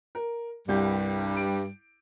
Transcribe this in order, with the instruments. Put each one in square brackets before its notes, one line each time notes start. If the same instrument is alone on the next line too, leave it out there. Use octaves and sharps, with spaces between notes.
[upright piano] A#4
[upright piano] C2 G6 [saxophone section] G2 G3
[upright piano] D7